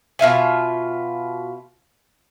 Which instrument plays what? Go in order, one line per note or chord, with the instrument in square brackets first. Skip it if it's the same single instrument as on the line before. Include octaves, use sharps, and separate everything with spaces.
[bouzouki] B2 F4 E5 G#5